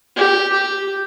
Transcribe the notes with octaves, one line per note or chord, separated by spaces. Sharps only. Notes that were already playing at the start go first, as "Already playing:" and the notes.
G4
G4